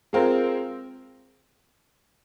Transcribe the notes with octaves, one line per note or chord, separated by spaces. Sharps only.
G#3 C4 F4 A#4